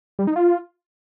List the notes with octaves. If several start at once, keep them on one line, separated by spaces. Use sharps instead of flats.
G3
D#4
F4